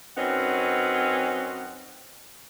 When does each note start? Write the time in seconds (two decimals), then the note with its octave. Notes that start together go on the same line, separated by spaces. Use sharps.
0.17 F#2 C4 C#4 D#4 B4 F#5